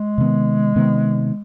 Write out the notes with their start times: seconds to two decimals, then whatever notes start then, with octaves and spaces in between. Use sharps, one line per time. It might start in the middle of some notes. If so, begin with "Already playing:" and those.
Already playing: G#3
0.18 C3 D#3 B3
0.76 C3 D#3 B3